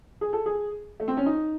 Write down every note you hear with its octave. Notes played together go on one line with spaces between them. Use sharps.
G#4
A4
G#4
A3
C4
C#4
D#4